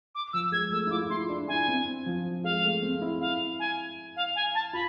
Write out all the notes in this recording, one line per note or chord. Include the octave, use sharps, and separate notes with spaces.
D6
F3 E6
G#3 G#6
A3 E6
E4
F4 D6
F4
E4 C6
D4
E4 G#5
C4
F3
G#3 F5
A3
C4
E4
F5
G#5
F5
G#5
A5
F4 B5